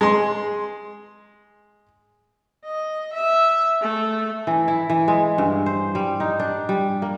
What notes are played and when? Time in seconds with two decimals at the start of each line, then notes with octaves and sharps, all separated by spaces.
0.01 G#3 C6
2.65 D#5
3.13 E5
3.81 A3
4.47 E3
4.68 E4
4.90 E3
5.08 G#3
5.38 G2
5.66 C5
5.95 G3
6.20 D#4
6.40 D4
6.69 G3
7.02 A#3